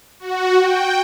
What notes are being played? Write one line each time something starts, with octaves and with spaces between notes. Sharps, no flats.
F#4
G5